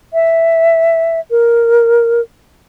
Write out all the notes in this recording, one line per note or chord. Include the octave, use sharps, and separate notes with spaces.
E5
A#4